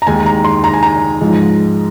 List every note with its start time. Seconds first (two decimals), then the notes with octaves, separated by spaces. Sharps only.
0.02 A#5
0.07 D#2 D#3 G#3 G#5
0.26 A#5
0.44 C6
0.64 A#5
0.74 G#5
0.83 A#5
1.21 G#2 F3 G#3